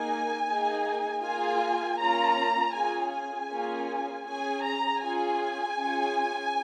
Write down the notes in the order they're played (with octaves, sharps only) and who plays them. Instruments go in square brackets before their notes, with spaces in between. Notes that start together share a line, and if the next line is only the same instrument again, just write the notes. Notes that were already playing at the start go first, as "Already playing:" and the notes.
Already playing: [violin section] A#3 D#4 G#4 G#5
A#3 D#4 G#4
A#3 F4 G#4 G#5
A#3 C#4 F4 A#5
C#4 F4 G#4 G#5
G#5
A#3 C#4 F4 G#4
C#4 G#4 G#5
A#5
C#4 F4 G#4 G#5
C#4 F4 G#4